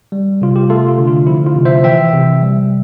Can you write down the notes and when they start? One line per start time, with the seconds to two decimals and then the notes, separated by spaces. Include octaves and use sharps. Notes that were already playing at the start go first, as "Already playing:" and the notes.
0.12 G3
0.41 C3 F4
0.56 G4
0.70 A3 F4 A4
0.89 F4
0.98 D3
1.08 F4
1.27 F3 E4
1.46 F4
1.56 C3
1.65 C5 E5
1.84 E3 E5 G5
2.13 C3
2.42 G3